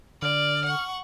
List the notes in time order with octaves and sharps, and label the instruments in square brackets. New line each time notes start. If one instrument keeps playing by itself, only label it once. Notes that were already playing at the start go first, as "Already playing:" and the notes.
[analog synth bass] D3 [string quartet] D5 [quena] F6
[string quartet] F#5 C#6